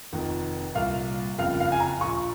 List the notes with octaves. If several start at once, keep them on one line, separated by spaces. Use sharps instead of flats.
F1 F2 D#3
C2 A#2 F5
F#1 F2 C#3 F5
F5
G#5
A#5
A#1 A#2 C#6